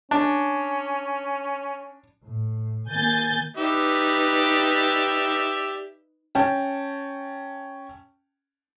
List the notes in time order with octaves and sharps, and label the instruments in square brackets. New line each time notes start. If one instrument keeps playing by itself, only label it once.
[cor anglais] C#4 [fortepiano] D4
[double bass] A2
[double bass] D#3 A#3 [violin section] G#5 G6 A6
[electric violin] D#4 B4 [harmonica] G4 D5 E5
[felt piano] C#4 G5 A5